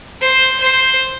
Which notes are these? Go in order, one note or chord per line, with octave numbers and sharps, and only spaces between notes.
C5
C5